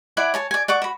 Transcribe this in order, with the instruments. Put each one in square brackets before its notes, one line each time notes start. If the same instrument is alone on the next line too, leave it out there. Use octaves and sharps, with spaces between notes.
[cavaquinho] E4 D5 F#5 G#5
C#5 G#5 A5
D5 G#5
D5 F#5 C#6 D6
F#4 B5